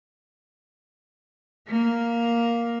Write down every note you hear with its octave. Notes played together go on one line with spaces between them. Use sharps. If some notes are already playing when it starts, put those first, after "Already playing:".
A#3